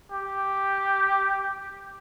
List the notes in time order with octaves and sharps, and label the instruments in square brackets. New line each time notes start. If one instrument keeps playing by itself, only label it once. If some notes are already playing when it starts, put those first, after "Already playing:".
[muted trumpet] G4